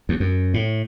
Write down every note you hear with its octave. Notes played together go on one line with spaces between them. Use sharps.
D#2
F#2
A2